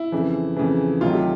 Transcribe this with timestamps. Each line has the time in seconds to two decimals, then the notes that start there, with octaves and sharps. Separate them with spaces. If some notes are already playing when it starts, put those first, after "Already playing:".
Already playing: E4
0.12 F2 C#3 E3
0.56 F2 C#3 E3
1.01 D2 C3 D#3 F#3 F4
1.13 G4